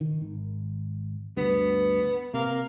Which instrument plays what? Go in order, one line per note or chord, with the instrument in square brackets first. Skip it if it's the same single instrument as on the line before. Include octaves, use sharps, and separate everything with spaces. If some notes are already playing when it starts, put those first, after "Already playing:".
[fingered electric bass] D#3
G#1
[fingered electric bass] D2 G2 [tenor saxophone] B3
[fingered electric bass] C3 [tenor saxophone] A#3